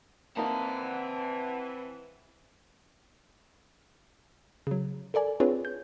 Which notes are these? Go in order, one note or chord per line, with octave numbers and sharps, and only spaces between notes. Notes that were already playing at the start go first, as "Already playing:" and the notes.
E3 A#3 C4 D#4 F#5 A5
C#3 F#3
A4 A#4 D5 G#5
C4 D4 F4 G#4 B4 C#5
G6